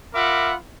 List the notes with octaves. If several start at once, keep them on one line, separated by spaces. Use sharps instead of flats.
F4 A#4 E5 F#5 B5 D6